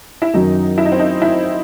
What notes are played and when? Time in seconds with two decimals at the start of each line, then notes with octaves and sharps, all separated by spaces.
0.22 E4
0.34 F#2 D#3 F#3 D#4
0.78 E4
0.85 D#4
0.92 C4
0.99 D#4
1.22 E4